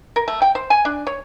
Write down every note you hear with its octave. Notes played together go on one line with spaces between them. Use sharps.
A#4
A3
G5
C5
G#5
D4
C#5